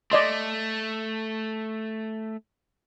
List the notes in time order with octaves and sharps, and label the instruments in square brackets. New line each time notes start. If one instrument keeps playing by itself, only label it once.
[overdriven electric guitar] A3 [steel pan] D5 D#5 C6